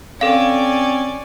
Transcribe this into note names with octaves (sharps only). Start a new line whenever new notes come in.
C4 C#4 A4 D5 F5